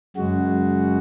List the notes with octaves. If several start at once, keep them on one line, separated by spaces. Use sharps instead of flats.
F#2 C#3 G#3 F#4